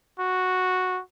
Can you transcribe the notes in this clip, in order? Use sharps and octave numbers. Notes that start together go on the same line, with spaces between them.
F#4